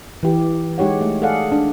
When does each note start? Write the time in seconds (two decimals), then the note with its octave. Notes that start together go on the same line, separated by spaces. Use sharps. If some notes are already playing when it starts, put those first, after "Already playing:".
0.23 E3 G4
0.78 G#3 D#4 G4 C#5 F#5
1.01 A3
1.22 G#4 A4 D5 F5 F#5
1.52 D4